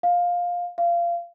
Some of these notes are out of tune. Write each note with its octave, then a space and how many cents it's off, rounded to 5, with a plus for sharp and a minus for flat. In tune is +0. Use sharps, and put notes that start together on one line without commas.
F5 +15
F5 -25